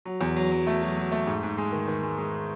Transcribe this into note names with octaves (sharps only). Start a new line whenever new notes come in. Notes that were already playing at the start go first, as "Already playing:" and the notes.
F#3
E2
F#3
F#3
A3
F#3
F#3
A3
G#2
G#2
G#3
D#3
D#3
G#3
G#3